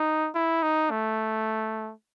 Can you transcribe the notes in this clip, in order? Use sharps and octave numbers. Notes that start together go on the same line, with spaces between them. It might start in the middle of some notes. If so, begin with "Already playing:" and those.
Already playing: D#4
E4
D#4
A3